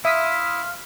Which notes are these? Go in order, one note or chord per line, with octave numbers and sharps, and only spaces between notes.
E4 E5 F5 C6 D#6 F6 B6